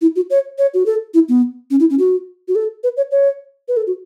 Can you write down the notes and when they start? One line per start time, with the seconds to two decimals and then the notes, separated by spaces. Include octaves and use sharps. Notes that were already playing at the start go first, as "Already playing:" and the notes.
0.02 E4
0.16 F#4
0.30 C#5
0.58 C#5
0.74 F#4
0.86 A4
1.14 E4
1.29 B3
1.71 C#4
1.80 E4
1.90 C#4
1.99 F#4
2.48 F#4
2.55 A4
2.84 B4
2.97 C#5
3.11 C#5
3.68 B4
3.77 A4
3.87 F#4